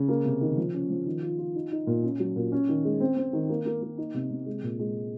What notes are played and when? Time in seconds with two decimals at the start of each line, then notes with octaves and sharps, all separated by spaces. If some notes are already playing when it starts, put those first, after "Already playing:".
Already playing: C#3
0.08 A#3
0.25 C3
0.41 D#3
0.57 F3
0.74 C#4
0.90 F3
1.06 D#3
1.22 F4
1.38 F4
1.55 D#4
1.72 D#4
1.87 A#2
2.03 C#4
2.20 F#3
2.36 A#2
2.52 C#4
2.68 D#3
2.85 G#3
3.00 C4
3.17 C4
3.33 D#3
3.49 A#3
3.66 A#3
3.82 A#3
3.98 D#4
4.14 C3
4.30 C3
4.46 G#3
4.63 A#2
4.79 G#3